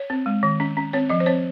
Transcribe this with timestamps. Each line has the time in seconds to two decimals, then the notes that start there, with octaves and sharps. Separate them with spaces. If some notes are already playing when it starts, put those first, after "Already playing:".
Already playing: C#5
0.10 C4
0.26 G#3
0.43 D#3
0.60 C#4
0.77 C#4
0.93 C4 C#5
1.09 F3 D#5
1.20 C5
1.26 C4 C#5